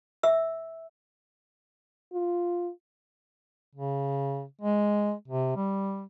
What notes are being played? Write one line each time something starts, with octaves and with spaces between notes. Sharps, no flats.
E5 E6
F4
C#3
G#3
C3
G3